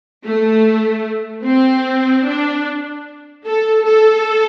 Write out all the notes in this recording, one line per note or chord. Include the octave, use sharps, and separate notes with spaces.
A3
C4
D4
A4
A4